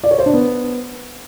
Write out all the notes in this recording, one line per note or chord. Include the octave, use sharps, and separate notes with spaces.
D5
C#5
C5
D4
B3